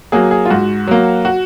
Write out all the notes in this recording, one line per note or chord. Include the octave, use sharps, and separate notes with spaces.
F#3 A#3 G#4
G#4
F4
G#2 F#4
F#3 A#3
F#4